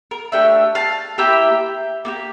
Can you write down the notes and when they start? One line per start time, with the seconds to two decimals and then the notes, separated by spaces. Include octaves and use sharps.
0.11 A#4
0.32 A3 D4 G4 E5 G5
0.75 F5 A5
1.18 A#3 E4 G4 E5 G5
2.05 A#3 E4 G4